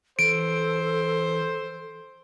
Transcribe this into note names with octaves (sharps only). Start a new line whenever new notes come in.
E3 A4 C5 D7